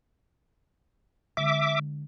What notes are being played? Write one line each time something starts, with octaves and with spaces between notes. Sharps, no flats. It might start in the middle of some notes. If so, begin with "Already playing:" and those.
D3 G#3 E5 D6